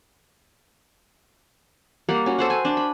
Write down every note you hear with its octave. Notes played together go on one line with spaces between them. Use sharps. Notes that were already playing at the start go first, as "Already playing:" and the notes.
G3 A#3 F#5
C#4 F#4
A4 C5 F#5
G#5
D4
B5